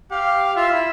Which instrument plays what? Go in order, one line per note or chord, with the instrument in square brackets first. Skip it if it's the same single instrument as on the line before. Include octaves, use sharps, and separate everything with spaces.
[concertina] G4 [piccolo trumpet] F5
[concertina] F4 [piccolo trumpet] E5
[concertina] E4